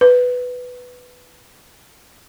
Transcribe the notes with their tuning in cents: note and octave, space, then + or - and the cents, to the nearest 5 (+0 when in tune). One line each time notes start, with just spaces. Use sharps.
B4 +5